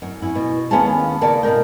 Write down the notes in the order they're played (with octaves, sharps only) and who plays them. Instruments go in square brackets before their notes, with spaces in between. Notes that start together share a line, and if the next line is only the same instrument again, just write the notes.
[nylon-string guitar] F#2
C#4 E4
B2
D#2 B3 C#4 G#4 F5 A5
C#3 A#3 B3 D5 A5
B2 B3 A#4 G5